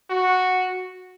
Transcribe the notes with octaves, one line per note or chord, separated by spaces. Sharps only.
F#4